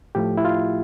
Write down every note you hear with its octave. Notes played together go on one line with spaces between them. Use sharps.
A2 F3 A3 G4
E4
F4